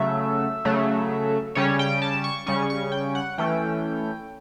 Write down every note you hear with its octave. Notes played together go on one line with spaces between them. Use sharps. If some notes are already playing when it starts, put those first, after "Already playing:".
Already playing: C#3 F#3 A3 E5
C#3 F#3 A3
C#3 G3 C#4 C#5
G5
A5
C#6
C#3 G3 C#4 C#6
C#6
G5
F#5
E3 A3 C#4 G5